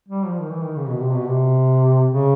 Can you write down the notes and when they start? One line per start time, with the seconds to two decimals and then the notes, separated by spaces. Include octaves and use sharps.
0.09 G3
0.27 F3
0.40 D#3
0.51 E3
0.63 D#3
0.76 C#3
0.88 B2
1.00 C3
1.13 B2
1.26 C3
2.12 C#3